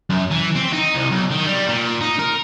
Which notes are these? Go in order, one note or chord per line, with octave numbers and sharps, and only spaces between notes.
F#2
E3
C4
D#4
C2
B1
D#3
G3
A#2
D#4
A#4